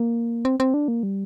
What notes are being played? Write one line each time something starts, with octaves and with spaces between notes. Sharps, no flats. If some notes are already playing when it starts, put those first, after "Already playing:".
Already playing: A#3
C4
C4
D4
A#3
G3